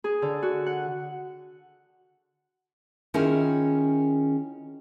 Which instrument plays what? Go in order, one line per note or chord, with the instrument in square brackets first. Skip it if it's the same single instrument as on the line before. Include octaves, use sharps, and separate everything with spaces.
[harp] G#4
D3
F#4
F#5
[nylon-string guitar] D#3 C#4 E4 F4 G#4